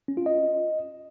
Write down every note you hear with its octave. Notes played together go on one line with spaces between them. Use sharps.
C#4
F4
D#5